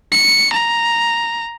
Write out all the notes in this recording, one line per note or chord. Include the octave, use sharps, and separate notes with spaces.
C#7
A#5